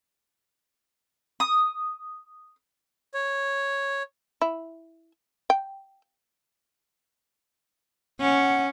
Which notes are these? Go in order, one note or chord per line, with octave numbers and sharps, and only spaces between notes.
D#6
C#5
E4
G5
C#4 F#5